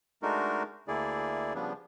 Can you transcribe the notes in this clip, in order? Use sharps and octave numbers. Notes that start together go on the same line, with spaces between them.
G#3 A3 D4 D#4 F#4 A#4
D2 D3 A#3 E4 G#4 D5
C#3 F3 G3 B3 D4